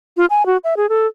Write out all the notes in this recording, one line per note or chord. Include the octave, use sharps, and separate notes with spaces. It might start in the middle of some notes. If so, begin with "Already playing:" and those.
F4
G#5
F#4
E5
G#4
A4